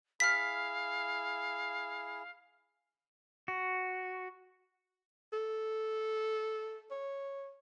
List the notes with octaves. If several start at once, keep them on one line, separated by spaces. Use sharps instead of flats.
E4 G#4 F5 F6 B6
F#4
A4
C#5